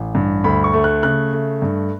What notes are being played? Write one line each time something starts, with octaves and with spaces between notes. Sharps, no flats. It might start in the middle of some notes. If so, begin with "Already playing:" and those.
Already playing: A1
G2
D2 B5
C#6
A3
F#6
C#3 F#6
A3
G2